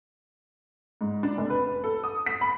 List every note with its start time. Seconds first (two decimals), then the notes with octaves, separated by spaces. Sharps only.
1.01 G#2
1.23 D4
1.37 F1
1.50 B4
1.67 B4
1.84 A4
2.04 D#6
2.26 B6
2.41 B5